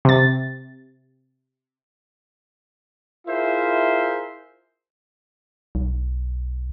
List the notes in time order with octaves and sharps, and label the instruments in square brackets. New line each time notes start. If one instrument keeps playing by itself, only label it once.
[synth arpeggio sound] C3 A6
[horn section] E4 F4 G#4 A#4 C5 E5
[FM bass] B1